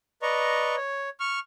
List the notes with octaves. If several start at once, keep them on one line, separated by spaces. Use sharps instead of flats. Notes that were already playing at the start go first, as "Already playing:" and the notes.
B4 D5 D#5 A#5 C#6
C#5
C#6 F6